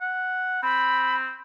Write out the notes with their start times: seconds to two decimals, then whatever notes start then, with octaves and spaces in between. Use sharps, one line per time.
0.01 F#5
0.63 C4 B5